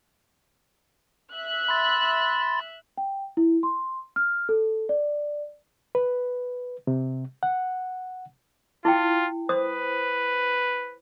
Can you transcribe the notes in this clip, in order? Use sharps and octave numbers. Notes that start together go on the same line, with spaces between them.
E5 F#6
B5 C6 A6
G5
E4
C6
F6
A4
D5
B4
C3
F#5
E4 F4 G5
B4 C5 D#6